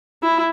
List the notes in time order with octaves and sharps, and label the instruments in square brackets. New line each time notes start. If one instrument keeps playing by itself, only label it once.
[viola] E4